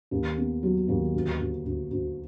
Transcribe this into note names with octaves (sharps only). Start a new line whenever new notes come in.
D#2
B3
F#3
D#2
D2
D2
D2
D2